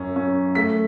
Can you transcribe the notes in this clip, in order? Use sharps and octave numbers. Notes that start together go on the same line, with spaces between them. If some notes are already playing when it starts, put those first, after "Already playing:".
Already playing: F#2 C#4
C#4
A3 B6